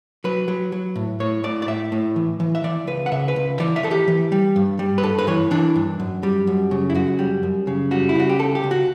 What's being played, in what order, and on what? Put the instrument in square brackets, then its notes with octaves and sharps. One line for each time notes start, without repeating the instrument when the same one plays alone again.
[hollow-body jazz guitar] F#3 B4
F#3
F#3
A2
A2 C#5
A2 D5
D5
A2 E5
A2
E3
E3
E5
E3 D5
C#2 B4
F#5
C#3 E5
B4
C#2
E3 D5
E5
E3 A4
G4
E3
G3
G2
G3
B4
G2 A4
B4
E3 C#5
E3 D4
G2
F#2
G3
F#2
C#3
E4
F#2 F#4
G3
F#2
C#3
G3 F#4
E4
C#3 F#4
G4
C#2 A4
G4
C#2
F#4